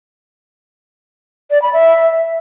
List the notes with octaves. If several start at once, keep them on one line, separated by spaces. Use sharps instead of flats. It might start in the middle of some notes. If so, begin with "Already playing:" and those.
D5
B5
E5